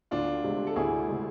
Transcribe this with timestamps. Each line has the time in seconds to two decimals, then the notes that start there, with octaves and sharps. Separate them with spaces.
0.11 D2 D4 F4
0.44 C3 G#3
0.67 A4
0.76 D2 E4 G#4
1.08 C3 G#3